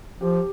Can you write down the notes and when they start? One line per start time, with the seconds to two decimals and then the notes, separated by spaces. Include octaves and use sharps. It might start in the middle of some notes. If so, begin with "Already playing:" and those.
0.20 F3 G4